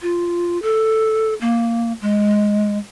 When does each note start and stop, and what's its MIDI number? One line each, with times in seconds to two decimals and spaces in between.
0.02 0.60 65
0.62 1.34 69
1.41 1.93 58
2.01 2.78 56